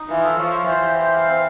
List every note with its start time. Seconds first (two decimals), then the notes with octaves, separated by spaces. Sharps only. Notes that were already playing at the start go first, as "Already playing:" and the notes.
Already playing: D#4
0.10 E3 F4
0.24 A4
0.38 F3 C#5
0.54 F4
0.68 E3 C5
0.83 G4
0.98 C5
1.13 F5
1.28 C4